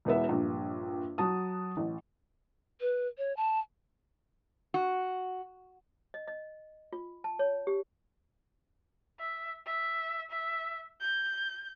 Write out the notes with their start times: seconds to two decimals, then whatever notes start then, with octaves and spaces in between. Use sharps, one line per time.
0.05 E1 E2 B3 E5
0.29 A#1 G2
1.18 F#3 F#4 A5 D#6
1.77 A1
2.81 B4
3.18 C#5
3.37 A5
4.74 F#4
6.14 D#5
6.28 D#5
6.93 F4
7.24 A5
7.39 C#5
7.67 G4
9.20 E5
9.67 E5
10.31 E5
11.01 G6